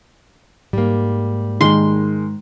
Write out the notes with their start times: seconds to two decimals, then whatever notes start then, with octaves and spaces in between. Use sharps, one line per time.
0.73 G#2 G3 A#3
1.61 D#3 G#3 C6